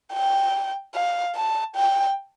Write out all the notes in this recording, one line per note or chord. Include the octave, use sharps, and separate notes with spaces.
G5
F5
A5
G5